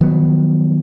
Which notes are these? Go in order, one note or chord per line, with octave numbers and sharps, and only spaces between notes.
D#3 F3 F#3 B3